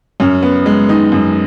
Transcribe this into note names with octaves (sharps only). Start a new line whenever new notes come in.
F#2 C#4
B3
G#3
D#3 D#4
F#2